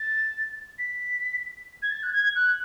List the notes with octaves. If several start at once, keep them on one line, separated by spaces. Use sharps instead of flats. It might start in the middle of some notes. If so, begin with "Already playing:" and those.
Already playing: A6
B6
G#6
A6
F#6
G#6
F#6